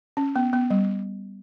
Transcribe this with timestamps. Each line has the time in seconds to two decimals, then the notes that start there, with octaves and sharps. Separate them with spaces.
0.17 C#4
0.36 B3
0.53 B3
0.70 G3